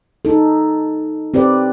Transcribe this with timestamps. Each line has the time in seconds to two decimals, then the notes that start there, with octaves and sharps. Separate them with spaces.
0.25 D#4 A4
1.34 C4 G4 B4 D5